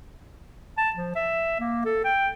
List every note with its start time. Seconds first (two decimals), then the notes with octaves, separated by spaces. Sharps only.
0.78 A5
0.96 F3
1.15 E5
1.60 A#3
1.85 A4
2.05 G5